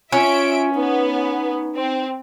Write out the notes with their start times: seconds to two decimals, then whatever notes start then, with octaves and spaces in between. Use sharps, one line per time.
0.12 C#4 F4 E5 D7
0.75 B3 D#4
1.77 C4